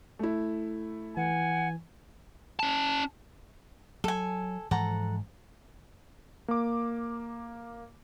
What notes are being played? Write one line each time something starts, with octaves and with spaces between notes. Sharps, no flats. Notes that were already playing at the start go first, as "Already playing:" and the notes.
A3 E4
E3 F#5 G#5
C#4 A5
F#3 A4 G#5
G#2 E3 F3 A4 F#5 A#5
A#3 D6